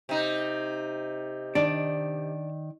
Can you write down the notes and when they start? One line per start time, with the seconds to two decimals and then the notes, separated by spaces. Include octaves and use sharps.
0.09 C3 D#4
1.55 D#3 D4 D5